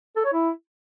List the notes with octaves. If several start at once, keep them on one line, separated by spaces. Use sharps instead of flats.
A4
C#5
E4